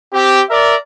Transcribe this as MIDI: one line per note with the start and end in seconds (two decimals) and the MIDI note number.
0.11 0.40 60
0.11 0.40 67
0.49 0.75 70
0.49 0.75 74
0.49 0.75 76